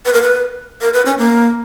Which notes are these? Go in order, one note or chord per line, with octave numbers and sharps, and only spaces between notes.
B4
A#4
B4
A#4
B4
C#4
A#3